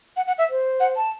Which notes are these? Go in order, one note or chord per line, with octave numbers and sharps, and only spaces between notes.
F#5
F#5
E5
C5
F#5
A5